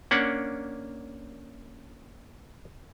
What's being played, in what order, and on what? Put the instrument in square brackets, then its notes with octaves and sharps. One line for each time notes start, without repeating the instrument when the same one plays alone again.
[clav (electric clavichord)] A#3 C#4 D4 F#5